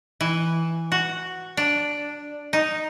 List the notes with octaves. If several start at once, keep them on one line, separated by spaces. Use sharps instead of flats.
E3
F#4
D4
D#4